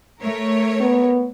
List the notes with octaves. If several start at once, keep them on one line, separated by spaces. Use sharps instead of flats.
A3 A#4 C#5
B3